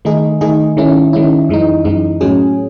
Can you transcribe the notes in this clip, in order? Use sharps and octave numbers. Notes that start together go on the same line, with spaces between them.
D#3 A3 D#4 G#4
D#3 A3 D#4 G#4
D#3 G#3 C#4 E4
D#3 G#3 C#4 E4
F#2 E3 G#3 D#4
F#2 E3 G#3 D#4
A2 F#3 C#4 G#4